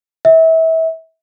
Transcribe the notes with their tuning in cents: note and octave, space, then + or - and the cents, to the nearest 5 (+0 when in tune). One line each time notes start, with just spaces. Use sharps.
E5 -30